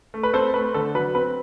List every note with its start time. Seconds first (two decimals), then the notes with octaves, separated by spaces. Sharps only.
0.14 A3
0.23 B4
0.34 C4 A4 C5
0.54 A3 B4
0.74 D3 A4
0.95 F#3 B4
1.15 C4 B4